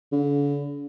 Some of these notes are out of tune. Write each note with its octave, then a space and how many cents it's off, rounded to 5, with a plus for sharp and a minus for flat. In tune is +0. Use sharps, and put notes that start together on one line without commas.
D3 -45